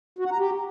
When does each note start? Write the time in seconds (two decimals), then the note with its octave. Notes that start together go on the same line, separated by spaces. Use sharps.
0.19 F#4
0.25 F#5
0.32 A#5
0.38 G4